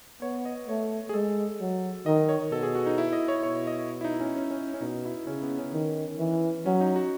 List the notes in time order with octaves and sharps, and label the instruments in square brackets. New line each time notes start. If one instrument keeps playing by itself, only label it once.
[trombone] B3 [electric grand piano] C#5
[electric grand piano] D#5
[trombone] A3 [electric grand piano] C#5
[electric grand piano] G#4
[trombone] G#3 [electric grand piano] A4
[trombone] F#3
[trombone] D#3 [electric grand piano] D#5
[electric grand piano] C#5
[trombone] B2 [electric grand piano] A4
[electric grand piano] G#4
F#4
D#4
E4
D#5
C#5
[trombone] B2 [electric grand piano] C#5
[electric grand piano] D#5
E4
D#4
C#4
C#4
C#4
C#4
[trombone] B2 [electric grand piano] D#4
[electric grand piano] E4
[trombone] C#3 [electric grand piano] C#4
[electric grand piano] B3
C#4
[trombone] D#3
E3
[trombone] F#3 [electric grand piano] C#4
[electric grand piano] D#4
F#4